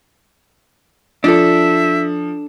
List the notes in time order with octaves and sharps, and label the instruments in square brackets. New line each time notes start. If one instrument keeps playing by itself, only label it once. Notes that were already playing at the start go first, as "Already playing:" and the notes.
[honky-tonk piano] F3 [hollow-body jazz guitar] D4 A4 [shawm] E5